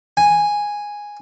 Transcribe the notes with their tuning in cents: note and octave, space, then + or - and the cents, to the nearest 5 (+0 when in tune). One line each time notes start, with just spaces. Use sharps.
G#5 -5